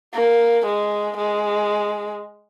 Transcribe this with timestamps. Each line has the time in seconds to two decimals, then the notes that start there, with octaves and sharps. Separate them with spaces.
0.14 A#3
0.66 G#3
1.17 G#3